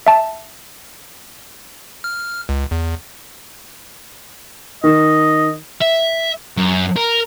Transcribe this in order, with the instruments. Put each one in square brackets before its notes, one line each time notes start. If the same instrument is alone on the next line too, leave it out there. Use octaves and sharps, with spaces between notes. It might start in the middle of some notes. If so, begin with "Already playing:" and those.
[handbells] E5 A5
[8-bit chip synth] F6
C#2
E2
[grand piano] D#3 [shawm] D#5
[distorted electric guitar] E5
F#2
A#4